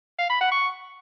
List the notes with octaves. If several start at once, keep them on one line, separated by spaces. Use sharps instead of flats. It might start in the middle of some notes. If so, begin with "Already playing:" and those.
F5
B5
F#5
C#6